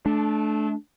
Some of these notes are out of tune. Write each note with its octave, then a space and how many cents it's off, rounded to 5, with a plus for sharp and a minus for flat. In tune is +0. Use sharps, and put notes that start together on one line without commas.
A3 -25 D4 +0